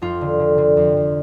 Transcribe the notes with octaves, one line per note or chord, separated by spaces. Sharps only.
F2 F4
D3
D3
D3
F2
F2